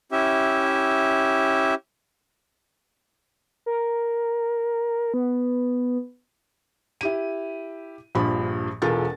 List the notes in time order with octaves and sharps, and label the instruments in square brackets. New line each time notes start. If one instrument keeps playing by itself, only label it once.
[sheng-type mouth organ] C#4 E4 G4 E5
[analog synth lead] A#4
B3
[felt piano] E4 G4 D#7
A#1 G2 F3 B5
E1 E2 F4 A4 A#4 A6